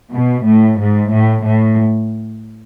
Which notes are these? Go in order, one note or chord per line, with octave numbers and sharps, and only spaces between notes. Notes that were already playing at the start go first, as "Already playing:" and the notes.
B2
A2
G#2
A2
A2